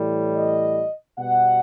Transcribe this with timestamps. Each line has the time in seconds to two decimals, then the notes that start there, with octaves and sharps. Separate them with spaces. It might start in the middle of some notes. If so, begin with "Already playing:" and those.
Already playing: A2 E3 G3
0.35 D#5
1.18 B2 G3 F#5